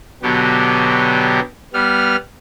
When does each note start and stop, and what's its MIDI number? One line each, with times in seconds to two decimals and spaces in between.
0.23 1.40 47
0.23 1.40 50
0.23 1.40 54
0.23 1.40 59
0.23 1.40 67
1.73 2.16 55
1.73 2.16 59
1.73 2.16 89